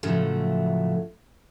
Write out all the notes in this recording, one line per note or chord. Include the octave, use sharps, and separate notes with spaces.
A2 C#3 F3 F#3 A3